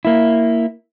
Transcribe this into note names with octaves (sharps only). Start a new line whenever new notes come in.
A#3 E4